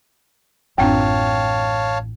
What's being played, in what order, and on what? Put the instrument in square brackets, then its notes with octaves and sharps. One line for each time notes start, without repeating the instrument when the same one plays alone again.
[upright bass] A1 [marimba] F#2 C4 D4 [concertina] C#5 F5 A5 [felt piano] G5